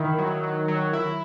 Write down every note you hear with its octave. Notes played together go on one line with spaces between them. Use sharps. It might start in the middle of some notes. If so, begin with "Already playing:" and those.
Already playing: D#3 E4
F#3
F#3
F#3
E4